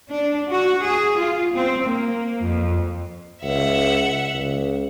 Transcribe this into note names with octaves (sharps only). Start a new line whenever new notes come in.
D4
F#4
G#4
F4
C4
A#3
F2
C#2 E5 F#5
C#2